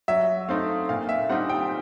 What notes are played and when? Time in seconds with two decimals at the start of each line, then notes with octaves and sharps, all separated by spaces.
0.08 F#3 E5
0.48 A3 C4 D#4 F5
0.89 A#2 F5
1.09 E5
1.30 G3 C4 D#4 F#5
1.49 G5